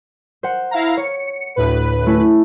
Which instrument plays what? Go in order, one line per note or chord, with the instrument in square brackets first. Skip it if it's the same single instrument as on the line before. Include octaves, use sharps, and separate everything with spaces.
[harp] C5 F#5
[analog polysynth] E4 F5 A#5
[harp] C#5 [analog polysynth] C#7
[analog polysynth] D2 A2 B4
[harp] A3 C#4 E4